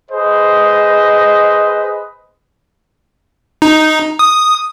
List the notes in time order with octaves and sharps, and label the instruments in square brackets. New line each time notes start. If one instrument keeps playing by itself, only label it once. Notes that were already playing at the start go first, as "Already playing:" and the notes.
[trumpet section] G#4 B4 C5 D#5
[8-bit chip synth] D#4
D#6